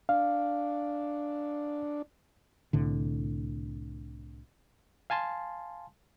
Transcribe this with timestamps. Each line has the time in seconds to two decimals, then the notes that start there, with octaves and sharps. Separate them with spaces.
0.09 D4 F5
2.73 C2 A2 D3
5.10 F5 G#5 A5 C6